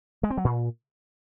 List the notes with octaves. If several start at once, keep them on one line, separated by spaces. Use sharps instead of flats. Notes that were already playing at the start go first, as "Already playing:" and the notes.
G#3
C4
F#3
A#2